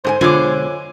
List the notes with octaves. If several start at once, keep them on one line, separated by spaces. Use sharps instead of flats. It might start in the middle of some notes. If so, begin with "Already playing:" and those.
G#2 G#4 C5 G#5
B2 D3 G#3 F4 C#5 G#5 D6